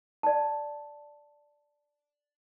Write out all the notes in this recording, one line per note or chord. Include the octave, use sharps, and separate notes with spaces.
D5 A5